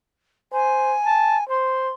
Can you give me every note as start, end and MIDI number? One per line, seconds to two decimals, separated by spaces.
0.53 0.96 72
0.53 1.48 80
1.06 1.38 81
1.49 1.93 72
1.49 1.91 84